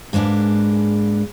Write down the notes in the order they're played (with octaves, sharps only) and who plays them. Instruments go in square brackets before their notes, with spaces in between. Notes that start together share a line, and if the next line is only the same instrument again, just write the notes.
[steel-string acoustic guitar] G#2 G#3 A#3 D4 B4